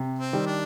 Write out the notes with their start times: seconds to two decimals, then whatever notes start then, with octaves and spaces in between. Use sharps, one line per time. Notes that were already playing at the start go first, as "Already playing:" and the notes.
Already playing: C3
0.19 C4
0.33 D#3 G3
0.46 D4